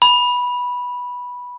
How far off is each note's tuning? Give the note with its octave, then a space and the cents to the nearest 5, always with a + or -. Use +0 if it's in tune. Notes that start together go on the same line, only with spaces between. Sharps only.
B5 -10